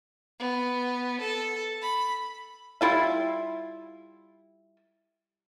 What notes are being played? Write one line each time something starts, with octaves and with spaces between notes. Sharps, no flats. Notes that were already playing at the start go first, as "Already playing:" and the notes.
B3
A4
B5
G3 E4 F4 E5